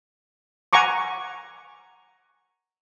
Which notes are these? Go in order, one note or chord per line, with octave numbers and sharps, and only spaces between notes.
F#5 G#5 A#5 C#6 D6